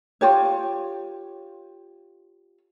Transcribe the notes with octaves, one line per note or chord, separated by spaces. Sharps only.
F4 G4 C#5